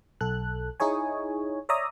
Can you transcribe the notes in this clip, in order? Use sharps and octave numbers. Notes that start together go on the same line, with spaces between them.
B1 A4 F#6
D#4 E4 G#4 C#5 G#5
C#5 D5 E5 A#5 D#6